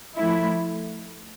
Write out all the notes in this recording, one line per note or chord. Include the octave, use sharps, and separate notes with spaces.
F3 A3 E4